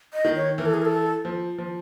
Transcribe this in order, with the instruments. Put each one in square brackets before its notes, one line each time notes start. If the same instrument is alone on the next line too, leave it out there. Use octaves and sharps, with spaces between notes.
[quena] D#5
[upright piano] D#3
[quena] C#5
[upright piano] E3 [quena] A#4
[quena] A4
G#4
A#4
A4
[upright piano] F3
F3